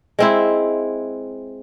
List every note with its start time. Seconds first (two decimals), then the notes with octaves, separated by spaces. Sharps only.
0.19 G#3 C4 E4